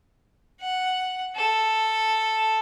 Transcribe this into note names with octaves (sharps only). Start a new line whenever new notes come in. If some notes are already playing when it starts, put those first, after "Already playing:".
F#5
A4